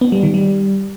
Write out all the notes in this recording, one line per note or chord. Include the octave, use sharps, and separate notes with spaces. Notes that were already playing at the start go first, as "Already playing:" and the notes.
B3
G3
D#3
G3